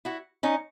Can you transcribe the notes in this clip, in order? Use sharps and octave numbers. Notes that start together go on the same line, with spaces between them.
E4 F#4
C#4 D#4